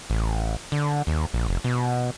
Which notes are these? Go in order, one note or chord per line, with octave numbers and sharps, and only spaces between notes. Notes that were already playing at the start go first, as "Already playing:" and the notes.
A1
D3
D#2
A#1
F1
B2